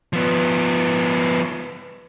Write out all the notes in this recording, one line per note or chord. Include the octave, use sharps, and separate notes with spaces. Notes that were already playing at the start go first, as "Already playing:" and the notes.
F3 B3